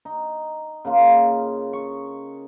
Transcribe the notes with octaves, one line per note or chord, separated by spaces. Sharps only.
D#4
C#3 A#3 F4
C#6